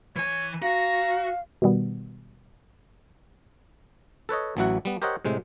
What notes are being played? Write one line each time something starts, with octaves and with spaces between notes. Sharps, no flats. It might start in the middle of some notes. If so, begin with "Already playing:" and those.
E3 C#5 G#5
F#4 F5 A#5
B2 D#3 G3 B3
A4 B4 C#5 D#5
A1 E3 F#3 E4 F#4 F#5
G3 B3
G4 A#4 C5 C#5 D#5 F#5
A2 C3 G#3